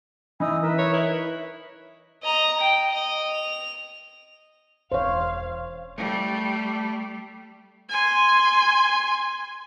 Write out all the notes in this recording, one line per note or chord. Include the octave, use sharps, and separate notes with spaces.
E3 D#4 G#5 D#6 E6
A#4 B4 E5
C#5
D#4 E4 B4
D#5 A#5
G5
D#5
F7
E1 E3 C5 C#5 F5
G3 A3
G#5 C6